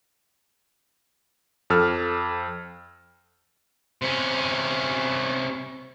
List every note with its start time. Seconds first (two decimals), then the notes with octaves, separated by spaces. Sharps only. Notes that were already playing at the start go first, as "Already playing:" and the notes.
1.70 F2 A4 E6 F6
4.02 C3 C#4